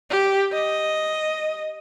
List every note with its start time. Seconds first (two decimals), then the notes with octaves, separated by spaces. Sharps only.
0.10 G4
0.53 D#5